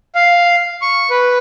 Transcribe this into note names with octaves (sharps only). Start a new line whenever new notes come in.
F5
C#6
B4